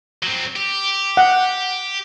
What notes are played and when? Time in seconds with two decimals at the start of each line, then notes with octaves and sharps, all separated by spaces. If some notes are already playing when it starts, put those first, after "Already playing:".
0.23 F#3 C4
0.56 G4
1.17 F#5